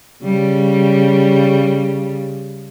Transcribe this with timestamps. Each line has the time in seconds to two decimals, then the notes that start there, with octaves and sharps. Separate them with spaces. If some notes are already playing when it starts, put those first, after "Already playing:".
0.24 C#3 G3